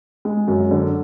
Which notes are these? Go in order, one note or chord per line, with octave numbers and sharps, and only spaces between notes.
G#3
F#2
D3